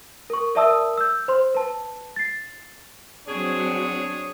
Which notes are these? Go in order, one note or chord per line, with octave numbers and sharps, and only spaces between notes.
A#4 C#6
A#4 D5 E5 A5 D#6 E6
E6 G6
C5 C6
B4 A5
A6 C7
F#3 C4 D4 G#4 C#5